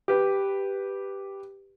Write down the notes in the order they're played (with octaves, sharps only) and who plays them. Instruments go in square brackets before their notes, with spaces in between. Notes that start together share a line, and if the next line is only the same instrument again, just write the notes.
[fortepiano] G4 B4